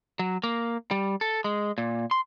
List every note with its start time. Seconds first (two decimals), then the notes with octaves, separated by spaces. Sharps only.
0.19 F#3
0.44 A#3
0.91 G3
1.21 A4
1.44 G#3
1.78 A#2
2.11 C6